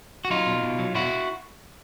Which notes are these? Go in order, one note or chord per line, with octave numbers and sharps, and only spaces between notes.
F#4
F#3 D#4 F4
B2
B2
F#3
B2 E4 F#4